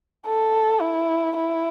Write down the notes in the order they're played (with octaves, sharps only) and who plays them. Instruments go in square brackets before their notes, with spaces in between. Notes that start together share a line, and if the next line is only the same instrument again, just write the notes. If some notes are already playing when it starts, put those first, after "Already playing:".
[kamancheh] A4
E4
E4